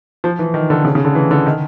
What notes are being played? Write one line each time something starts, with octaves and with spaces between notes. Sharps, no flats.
F3
E3
D#3
D3
C#3
C#3
D3
E3
D3
D#3